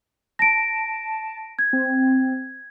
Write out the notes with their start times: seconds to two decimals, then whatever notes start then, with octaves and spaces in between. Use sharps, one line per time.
0.39 A5 A#6 D7
1.59 G#6
1.73 C4